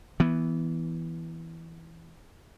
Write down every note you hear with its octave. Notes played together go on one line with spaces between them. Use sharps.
E3 B3